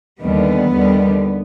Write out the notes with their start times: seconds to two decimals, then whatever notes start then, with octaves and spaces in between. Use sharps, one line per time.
0.20 D#2 D3 G3 B3
0.70 D#2 D3 G3